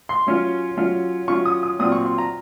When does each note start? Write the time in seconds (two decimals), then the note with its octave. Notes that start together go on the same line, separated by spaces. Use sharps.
0.09 C6
0.27 F#3 C#4 F4
0.77 F#3 C#4 F4
1.28 F#3 C#4 F4 C#6
1.45 D#6
1.63 D#6
1.79 A#2 F#3 C4 F4 D#6
1.92 C#6
2.05 C6
2.18 A#5